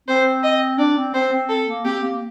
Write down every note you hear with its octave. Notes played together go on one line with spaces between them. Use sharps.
C4 C5
D#5
D4 D5
C4
C4 C5
C4
A4
A#3
C4 G4
A#3